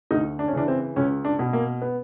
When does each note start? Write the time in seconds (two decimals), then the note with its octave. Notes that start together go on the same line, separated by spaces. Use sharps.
0.11 D2 D#4
0.39 D4
0.48 C#4
0.53 C#3 E3 D4
0.68 C4
0.96 C#2 C#4
1.25 D4
1.39 B2
1.53 A#3
1.82 B3